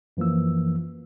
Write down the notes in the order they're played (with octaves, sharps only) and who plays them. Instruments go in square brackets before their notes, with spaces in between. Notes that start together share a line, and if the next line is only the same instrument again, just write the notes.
[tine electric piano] F#2 E3 F3 A#3 E6